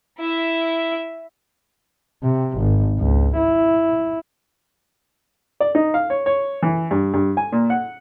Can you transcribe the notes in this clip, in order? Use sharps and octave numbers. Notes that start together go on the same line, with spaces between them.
E4 E5
C3
G#1
C#2
E4
D5
D#4
F5
C#5
C#5
E3
G2
G2
G#5
A#2
F#5